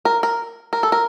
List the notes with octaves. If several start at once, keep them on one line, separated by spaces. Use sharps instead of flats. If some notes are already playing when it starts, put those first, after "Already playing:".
A#4
A#4
A#4
A4
A#4